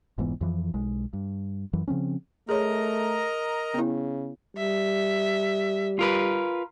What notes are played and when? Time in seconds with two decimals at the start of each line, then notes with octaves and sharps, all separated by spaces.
0.18 F1 G#2 E3 B3
0.41 F2 E3 F3
0.74 B1 G#3
1.13 G2
1.73 F#2 E3 F#3
1.88 C#3 F3 C4 C#4
2.49 A3 G#4 A#4 C#5 D#5 A#5
3.74 C#3 B3 E4
4.57 G3 E5
5.99 F4 A#4 B4